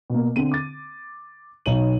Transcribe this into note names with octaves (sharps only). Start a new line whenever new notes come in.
B2 A#3
D3 C4 D#7
D6 A6
B1 D#4 C#5 D#7 F#7